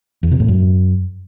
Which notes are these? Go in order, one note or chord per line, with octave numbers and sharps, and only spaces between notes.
E2
C3
A2
F#2